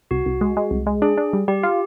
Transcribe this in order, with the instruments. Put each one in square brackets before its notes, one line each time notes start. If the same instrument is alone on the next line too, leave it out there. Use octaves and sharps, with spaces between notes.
[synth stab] C2 [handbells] F#4
[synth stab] C2
G#3
G#3
C2
G#3
[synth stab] D4 [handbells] G#4
[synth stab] D4
G3
[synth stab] G3 [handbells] G4
[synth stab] F4